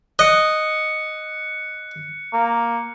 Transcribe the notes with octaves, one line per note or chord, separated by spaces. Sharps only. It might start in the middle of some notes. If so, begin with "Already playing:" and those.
D#5 F#6 C#7
A#3